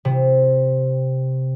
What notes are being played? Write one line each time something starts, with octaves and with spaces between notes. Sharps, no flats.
C3